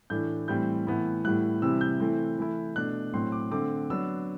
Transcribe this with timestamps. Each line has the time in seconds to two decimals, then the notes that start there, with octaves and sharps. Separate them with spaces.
0.10 A2 E3 A3 D4 G6
0.48 A2 E3 G3 C4 E4 G6
0.87 A2 E3 B3 E4
1.25 A2 G3 B3 E4 F#6
1.62 C3 E3 G3 C4 E4 E6
1.81 G6
2.00 E3 A3 C4 E4
2.39 E3 A3 E4
2.76 B2 A3 D4 F#6
3.14 A2 F#3 C4 C6
3.32 D6
3.51 D3 A3 C4 D6
3.90 F#3 B3 D4 E6